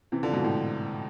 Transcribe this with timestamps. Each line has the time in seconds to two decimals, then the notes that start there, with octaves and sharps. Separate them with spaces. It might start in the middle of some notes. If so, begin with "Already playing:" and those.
0.12 C3 E3
0.23 D3 F3
0.33 G#2 B2
0.44 A2